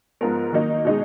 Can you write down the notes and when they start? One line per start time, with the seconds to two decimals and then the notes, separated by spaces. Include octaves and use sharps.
0.21 G#2 F3 B3 F4 A#4
0.52 D#3 F#3 A#3 D#4
0.85 B2 G#3 D#4 G#4